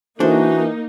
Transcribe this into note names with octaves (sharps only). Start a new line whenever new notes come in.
E3 A#3 D4 D#4 F#4 A4 C5